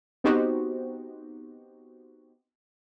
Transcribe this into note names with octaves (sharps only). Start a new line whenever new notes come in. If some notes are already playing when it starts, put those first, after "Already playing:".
B3 C4 D#4 F#4 G4 C5